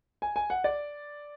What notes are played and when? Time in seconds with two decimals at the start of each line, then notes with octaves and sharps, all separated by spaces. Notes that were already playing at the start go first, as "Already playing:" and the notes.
0.22 G#5
0.36 G#5
0.50 F#5
0.64 D5